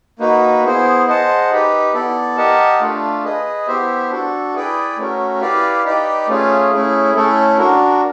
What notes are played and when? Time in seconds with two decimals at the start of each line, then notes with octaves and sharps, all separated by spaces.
0.19 A#3 D#4 F#4 B4
0.64 B3 E4 G#4 C5
1.06 G#4 C5 D#5 F#5 A5
1.50 D#4 G4 B4
1.93 B3 E4 A4 D5
2.37 G4 A#4 D#5 F#5 A5
2.80 A3 D4 F4
3.24 G#4 B4 D#5
3.67 B3 E4 G4 C5 E5
4.10 D4 F#4 A4
4.54 E4 G#4 B4 D5 G5
4.97 A3 C#4 F#4 A#4
5.40 E4 G4 B4 D5 F5
5.84 D#4 G4 B4 D5 G5
6.28 A3 C#4 F4 G#4
6.71 A3 C#4 E4 G#4
7.15 A3 C#4 E4 A4
7.58 D4 F#4 A#4